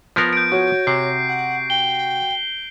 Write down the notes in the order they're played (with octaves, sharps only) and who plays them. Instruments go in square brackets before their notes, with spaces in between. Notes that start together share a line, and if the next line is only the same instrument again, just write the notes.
[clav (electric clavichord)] F3 B3 A#4
[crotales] G6 D7
[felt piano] F#4 [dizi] C#5
[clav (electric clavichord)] C3 [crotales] C7
[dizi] F#5
[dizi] G5 [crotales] G7